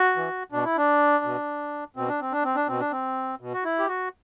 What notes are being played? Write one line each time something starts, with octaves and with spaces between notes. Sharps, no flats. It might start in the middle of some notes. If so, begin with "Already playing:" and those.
Already playing: F#4
E3
B2 D4
E4
D4
B2
B2 C4
D4
C4
D4
C4
D4
B2 C4
D4
C4
B2
F#4
E4
G4
F#4